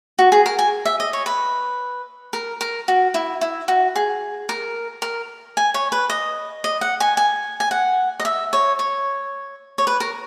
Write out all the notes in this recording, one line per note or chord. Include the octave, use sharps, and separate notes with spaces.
F#4
G#4
A#4
G#5
E5
D#5
C#5
B4
A#4
A#4
F#4
E4
E4
F#4
G#4
A#4
A#4
G#5
C#5
B4
D#5
D#5
F#5
G#5
G#5
G#5
F#5
D#5
E5
C#5
C#5
C#5
B4
A#4